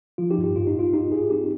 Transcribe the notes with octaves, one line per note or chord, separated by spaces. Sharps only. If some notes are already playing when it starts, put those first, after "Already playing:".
F3 F4
D#4 G4
G2
G4
G#2 F4
D#4
G#2 F4
G#2 D#4 G4
G#2 F4 G#4
C4 D#4 G4